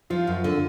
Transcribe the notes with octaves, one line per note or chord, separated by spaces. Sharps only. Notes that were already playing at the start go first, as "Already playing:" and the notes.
F3 F4
F#2
D3